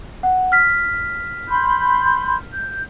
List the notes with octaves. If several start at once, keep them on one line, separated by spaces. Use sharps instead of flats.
F#5
F6 B6
B5 C6 G6
G6